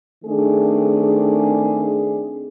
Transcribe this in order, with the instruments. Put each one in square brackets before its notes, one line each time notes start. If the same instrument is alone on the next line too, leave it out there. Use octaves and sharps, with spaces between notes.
[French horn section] D#3 A3 C4 D4 G#4